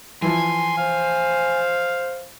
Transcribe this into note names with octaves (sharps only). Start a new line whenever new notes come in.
E3 F3 G#5 C6
C5 F5